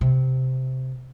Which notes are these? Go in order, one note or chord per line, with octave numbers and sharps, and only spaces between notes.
C3